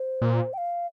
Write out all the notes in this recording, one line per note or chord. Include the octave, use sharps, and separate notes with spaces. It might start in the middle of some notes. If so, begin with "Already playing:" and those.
Already playing: C5
A#2
G5
F5